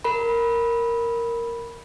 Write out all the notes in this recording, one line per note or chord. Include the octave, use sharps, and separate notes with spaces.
A#4 B5